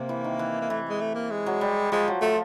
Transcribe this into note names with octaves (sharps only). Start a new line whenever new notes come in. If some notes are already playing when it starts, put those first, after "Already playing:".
Already playing: C3 A#3
E3
D#3
E3
A#3
E3 A3
G#3
A3
A#3
G#3
F#3
G3
F3 G#3
F#3
F3 A3